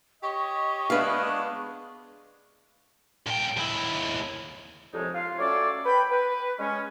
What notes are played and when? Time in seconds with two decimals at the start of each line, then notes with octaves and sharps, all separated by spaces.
0.23 G4 C#5 D#5 C#6
0.90 G#3 B3 D4 B4 F5
3.26 A#2 G5
3.57 D#2 E4
4.93 C2 F2 F3 G#3 D#4 C#5
5.14 F4 F5
5.39 F#3 A3 C#4 A4 C#5 D5
5.86 B4 G5 B5
6.11 B4
6.59 G#3 C#4